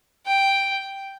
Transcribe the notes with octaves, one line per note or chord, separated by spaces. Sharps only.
G5